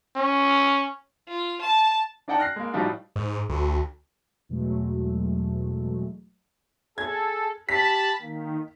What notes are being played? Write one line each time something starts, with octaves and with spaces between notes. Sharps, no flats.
C#4
F4
A5
D4 D#4 D5 F#5 G5 A5
F6 F#6 A#6 C7
G#3 A#3
A2 F3 G3 D#4 F4 F#4
G#2
D2
E2 B2 F#3 G#3 A3
G#4 A4 G#6
G4 A5 B5 B6
D#3 A#3